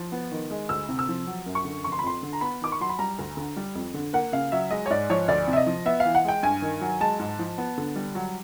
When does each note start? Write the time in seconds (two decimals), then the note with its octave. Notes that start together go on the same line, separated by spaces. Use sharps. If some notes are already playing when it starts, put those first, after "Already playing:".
Already playing: F3
0.12 B3
0.32 D#3
0.50 G#3
0.69 D2 E6
0.89 C3
0.99 E6
1.08 F3
1.27 F#3
1.46 F#2
1.55 C#6
1.65 D3
1.84 F1 C#6
1.92 C6
1.99 B5
2.03 F2 C6
2.23 D3
2.33 A#5
2.41 B3 B5
2.61 D#3 D6
2.72 C#6
2.81 F#3 C6
2.90 B5
2.99 G3 A#5
3.19 D2
3.37 D3
3.57 G3
3.75 F2
3.94 D3
4.13 A#3 F#5
4.33 C#3 F5
4.52 F#3 E5
4.71 G#3 D#5
4.86 C#5
4.90 G#2 D5
5.10 F3 C#5
5.28 D2 D5
5.47 C3
5.53 E5
5.57 D#5
5.66 F3
5.86 B3 E5
6.00 F5
6.05 E3
6.15 F#5
6.25 G#3 G5
6.43 G2 G#5
6.62 D#3
6.81 F#3
7.00 G#3 A5
7.19 G#2
7.39 F3
7.58 B3
7.78 D3
7.96 G3
8.15 F#3